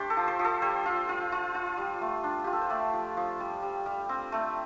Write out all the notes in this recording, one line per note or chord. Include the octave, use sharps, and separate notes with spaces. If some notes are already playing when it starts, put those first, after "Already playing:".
Already playing: A3 D4 G4 C5 D5
A4
F3
C5
F3
A4
G3 C5
F4
F4
F4
F4
G3
A3
D4
F4 G4
A4
C5
A3 D5
F3
F3
G3
G3
G3
C4
A3